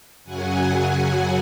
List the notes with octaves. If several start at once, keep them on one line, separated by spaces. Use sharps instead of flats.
F#2 C#3 F#3 F#5 G#5